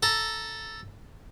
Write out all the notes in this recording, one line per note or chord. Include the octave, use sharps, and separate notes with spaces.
A4 A#5